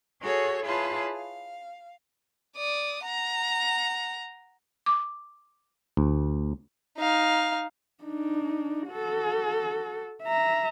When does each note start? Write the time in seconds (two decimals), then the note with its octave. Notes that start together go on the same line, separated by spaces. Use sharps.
0.22 F#4 G#4 A4 C#5
0.66 E4 F4 G#4 B4 C#5 A5
1.13 F5
2.57 D5 D#6
3.06 F#5 A#5
4.86 D6
5.97 D2
6.98 D#4 F5
8.04 D4 D#4
8.89 F#4 A4
10.23 E5 A#5